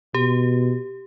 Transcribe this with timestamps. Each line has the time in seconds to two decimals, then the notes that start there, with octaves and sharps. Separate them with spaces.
0.14 B2 G4